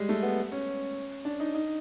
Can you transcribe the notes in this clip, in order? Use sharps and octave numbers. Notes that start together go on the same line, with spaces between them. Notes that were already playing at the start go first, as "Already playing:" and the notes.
Already playing: G3 G#3
A3
B3
C#4
D4
D#4
D#4